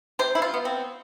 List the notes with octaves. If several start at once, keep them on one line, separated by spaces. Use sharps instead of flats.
C3 C5
E4
F4
B3
C4